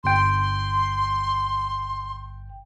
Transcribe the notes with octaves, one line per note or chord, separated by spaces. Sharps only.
G1 G5 C6